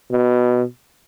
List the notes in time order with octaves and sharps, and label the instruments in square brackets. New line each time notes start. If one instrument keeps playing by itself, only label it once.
[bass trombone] B2